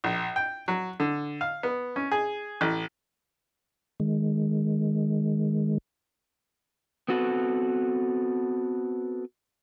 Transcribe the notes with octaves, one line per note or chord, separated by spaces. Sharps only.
A#1
G5
F#3
D3
F5
B3
C#4
G#4
A1
D#3 G#3
B3 C4 F#4 A4 B4